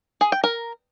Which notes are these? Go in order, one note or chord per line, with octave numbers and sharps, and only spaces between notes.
G#4
G5
A#4